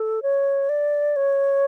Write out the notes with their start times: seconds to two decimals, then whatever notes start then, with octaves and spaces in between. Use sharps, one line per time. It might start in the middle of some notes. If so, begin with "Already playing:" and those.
Already playing: A4
0.22 C#5
0.69 D5
1.16 C#5